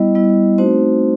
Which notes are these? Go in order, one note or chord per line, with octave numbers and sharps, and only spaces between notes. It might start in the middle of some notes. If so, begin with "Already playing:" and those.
Already playing: G3 B3 E4 D#5
G3 B3 E4
A3 C4 D#4 F#4 C5